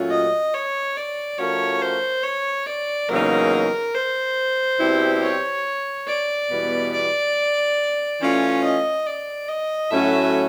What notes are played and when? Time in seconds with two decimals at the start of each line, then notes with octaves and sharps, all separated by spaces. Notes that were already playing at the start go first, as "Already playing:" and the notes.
Already playing: A#2 F#3 A3 C#4 F4
0.10 D#5
0.54 C#5
0.96 D5
1.38 F3 A3 C#4 F#4 A#4 C#5
1.82 C5
2.23 C#5
2.66 D5
3.09 E2 C#3 F#3 A#3 D#4 A#4
3.94 C5
4.80 B2 G3 C4 E4 G4
5.22 C#5
6.07 D5
6.50 E2 B2 G3 B3 E4
6.93 D5
8.20 E3 A3 C#4 F4 C#5
8.64 D#5
9.06 D5
9.48 D#5
9.91 A2 F#3 A3 C#4 F#4 E5